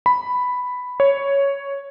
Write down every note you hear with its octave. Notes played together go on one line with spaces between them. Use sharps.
B5
C#5